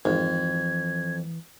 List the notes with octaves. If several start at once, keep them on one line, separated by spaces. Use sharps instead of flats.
G#1 F2 E3 G#6